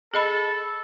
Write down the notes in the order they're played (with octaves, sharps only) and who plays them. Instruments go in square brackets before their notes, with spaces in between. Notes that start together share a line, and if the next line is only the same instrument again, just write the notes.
[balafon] G#4 D#5 B5 [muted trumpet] A4